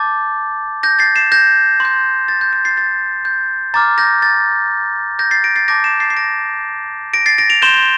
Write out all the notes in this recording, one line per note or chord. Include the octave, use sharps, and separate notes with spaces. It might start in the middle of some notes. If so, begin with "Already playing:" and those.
Already playing: A5 D6 G6 A6
G6 A#6
A6 C7
C7 E7
G6 A#6
C6 G6
A6
G6
G6
A6 C7
A6
G6
A#5 D6 F6 A6
G6 A#6
A6
G6 A#6
A6 C7
A#6 D7
A6 C7
A5 D6 G6 A#6 D7
C7 E7
A6 C7
C7
A#6 D7
A#6 D7
A6 C7
A#6 D7
D7 F7
C6 G6 E7 G7